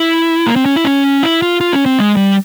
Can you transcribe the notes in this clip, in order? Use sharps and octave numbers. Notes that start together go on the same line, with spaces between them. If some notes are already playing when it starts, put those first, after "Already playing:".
Already playing: E4
A#3
C4
C#4
E4
C#4
E4
F4
F4
C#4
C4
G#3
G3